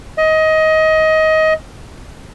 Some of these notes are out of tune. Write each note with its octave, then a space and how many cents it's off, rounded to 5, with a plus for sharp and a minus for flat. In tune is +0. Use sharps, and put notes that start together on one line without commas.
D#5 +20